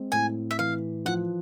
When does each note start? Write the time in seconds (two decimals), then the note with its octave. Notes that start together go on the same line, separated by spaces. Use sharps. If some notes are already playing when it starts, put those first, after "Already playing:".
Already playing: G#3 C4
0.12 A2 G#5
0.51 E5
0.59 E3 F5
1.05 F3 F#5